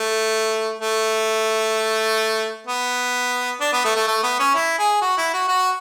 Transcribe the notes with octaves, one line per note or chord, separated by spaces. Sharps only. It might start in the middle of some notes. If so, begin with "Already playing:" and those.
Already playing: A3
A3
B3
D4
B3
A3
A3
A3
B3
C#4
E4
G#4
F#4
E4
F#4
F#4